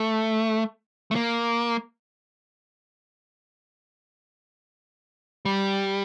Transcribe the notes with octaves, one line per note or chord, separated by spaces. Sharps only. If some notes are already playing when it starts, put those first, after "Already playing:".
Already playing: A3
A3
A#3
G3